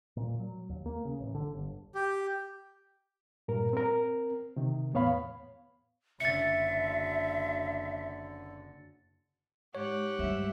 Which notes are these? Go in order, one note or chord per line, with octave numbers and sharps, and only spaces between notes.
A#2
F#3
D#2
A#3
C#3
A1
D3
G1
G4
G2 A#2 A#4
C4 A#4
C3 D#3
E2 A2 B3 C#5 F5 B5
F#1 D3 E5 A6 C#7
G#2 G4 C#5 F#5
D2 G2 G#3 E5